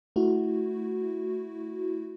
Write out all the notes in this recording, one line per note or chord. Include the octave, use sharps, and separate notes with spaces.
A3 E4 F#4